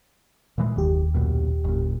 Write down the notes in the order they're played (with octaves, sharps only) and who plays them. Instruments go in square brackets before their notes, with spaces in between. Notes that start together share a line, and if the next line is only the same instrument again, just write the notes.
[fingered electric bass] A#2 E3 G#3
[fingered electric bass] F#1 [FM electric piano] D#2 G4
[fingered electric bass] B1 F#2 A#2
F#1 A#2